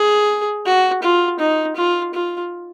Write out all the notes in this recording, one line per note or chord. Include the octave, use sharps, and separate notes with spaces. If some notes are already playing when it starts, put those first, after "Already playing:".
Already playing: G#4
F#4
F4
D#4
F4
F4